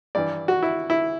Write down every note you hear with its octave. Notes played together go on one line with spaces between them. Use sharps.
G2 E3 D5
F#4
E4
E4